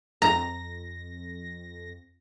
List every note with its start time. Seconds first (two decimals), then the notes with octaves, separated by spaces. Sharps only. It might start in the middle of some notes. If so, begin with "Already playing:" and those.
0.22 F2 A#5 A#6